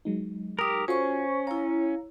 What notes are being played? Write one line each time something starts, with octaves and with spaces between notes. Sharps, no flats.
F#3 G#3 D#4
G4 A#4 D#6 E6
C#4 F4 F#4 A4 C5 C#6
E4 C#5 F5 A#5